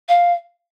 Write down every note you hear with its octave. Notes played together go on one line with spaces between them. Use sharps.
F5